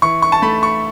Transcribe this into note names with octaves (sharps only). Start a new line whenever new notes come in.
E3 C#6
C#6
A5
A3 B5
C#6